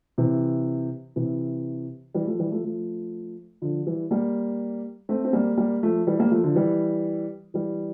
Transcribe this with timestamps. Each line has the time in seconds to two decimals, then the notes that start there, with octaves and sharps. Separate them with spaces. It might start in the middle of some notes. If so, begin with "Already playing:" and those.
0.18 C3 E3
1.16 C3 E3
2.14 E3 G3
2.26 F3 A3
2.39 E3 G3
2.52 F3 A3
2.64 F3 A3
3.62 D3 F3
3.86 E3 G3
4.11 G3 A#3
5.09 A3 C4
5.25 C4
5.33 G3 A#3
5.57 G3 A#3
5.83 F3 A3
6.07 E3 G3
6.19 G3 A#3
6.31 F3 A3
6.44 D3 F3
6.56 E3 G3
7.54 E3 G3